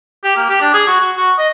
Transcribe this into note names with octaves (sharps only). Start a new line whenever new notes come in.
G4
A#3
G4
D4
G#4
F#4
F#4
F#4
D#5